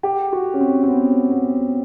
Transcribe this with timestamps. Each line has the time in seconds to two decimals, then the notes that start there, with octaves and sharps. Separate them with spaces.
0.03 G4
0.33 F#4
0.54 C#4
0.61 C4
0.83 C4
0.88 B3
1.31 B3